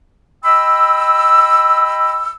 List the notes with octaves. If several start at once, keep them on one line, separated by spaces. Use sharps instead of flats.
D#5 G5 B5 E6